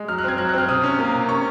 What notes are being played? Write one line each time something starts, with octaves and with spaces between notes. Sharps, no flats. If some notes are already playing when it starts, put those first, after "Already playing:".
Already playing: G#3
F#3 F6
F#6
C4 G#6
F#3 F#6
F#6
C4 F6
C3 D#6
C#4
A#3
C3
C#4 C#6